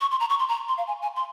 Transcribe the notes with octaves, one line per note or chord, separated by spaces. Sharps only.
C#6
C6
A#5
C#6
C6
A#5
C6
F5
G#5
G#5
C6